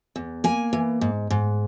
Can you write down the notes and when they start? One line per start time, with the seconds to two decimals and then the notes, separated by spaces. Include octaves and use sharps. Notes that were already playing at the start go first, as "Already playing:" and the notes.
0.16 E2
0.44 A#3 G#5
0.73 E3
1.01 G#2
1.30 G#2